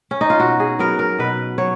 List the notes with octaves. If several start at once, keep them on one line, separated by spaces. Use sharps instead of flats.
C#4
D#4
F4
B2 F#4
G#4
F#3 B3 A#4
A#4
B2 B4
F#3 C#5